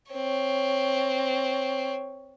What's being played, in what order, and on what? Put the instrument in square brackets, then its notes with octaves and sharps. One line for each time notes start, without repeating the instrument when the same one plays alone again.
[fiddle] C4 C#5